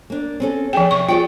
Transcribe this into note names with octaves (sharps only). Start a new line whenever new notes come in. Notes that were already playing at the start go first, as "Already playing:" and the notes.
A#3 D4
C4 C#4 A4
F3 D#4 G#4 G5
C3 C#6
F4 G#4 D5 G5